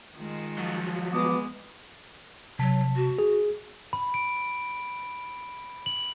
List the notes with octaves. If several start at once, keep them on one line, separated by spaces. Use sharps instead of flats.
D#3 G#3 F4
F3 F#3
G#3 B3 D6 D#6
C3 F#3 A5 B6
F#4
G#4
B5
D7
F#7